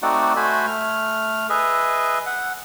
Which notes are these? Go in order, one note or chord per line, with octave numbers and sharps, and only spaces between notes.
A3 C4 D#4 F#4 D5 F#5
A3 F#4 C5 G#5 B5
A3 F6
G#4 B4 D#5 E5
F#5